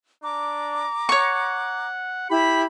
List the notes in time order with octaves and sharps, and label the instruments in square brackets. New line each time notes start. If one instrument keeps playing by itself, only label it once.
[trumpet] D4 [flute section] A#5 D6
[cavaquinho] C#5 C#6 [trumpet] F#5
[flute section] E4 G4 [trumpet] B5